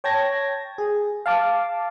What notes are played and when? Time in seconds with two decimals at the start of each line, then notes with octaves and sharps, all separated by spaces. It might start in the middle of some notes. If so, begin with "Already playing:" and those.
0.04 C#5 G5 A5 G#6 A#6
0.78 G#4
1.26 F5 A5 D6